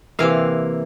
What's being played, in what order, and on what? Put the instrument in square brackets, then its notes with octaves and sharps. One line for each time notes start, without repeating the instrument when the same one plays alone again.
[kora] C3 E3 A#3 F5